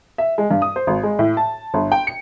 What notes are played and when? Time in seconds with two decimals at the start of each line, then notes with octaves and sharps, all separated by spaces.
0.18 E5
0.38 G#3
0.51 G2
0.62 D#6
0.76 C5
0.87 G#1
1.03 G#3
1.19 A2
1.37 A5
1.74 G1
1.92 G5
2.07 C#7